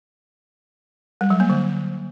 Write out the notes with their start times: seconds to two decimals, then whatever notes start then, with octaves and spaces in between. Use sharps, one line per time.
1.21 G3
1.30 F#3
1.40 A#3
1.50 D3